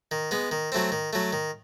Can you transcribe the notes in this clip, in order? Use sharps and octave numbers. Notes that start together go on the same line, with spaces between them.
D#3
G#3 B3
D#3
F#3 A3 C4
D#3
F#3 A3
D#3